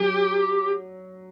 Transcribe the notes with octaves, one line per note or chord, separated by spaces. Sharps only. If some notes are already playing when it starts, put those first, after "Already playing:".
Already playing: F#3 G4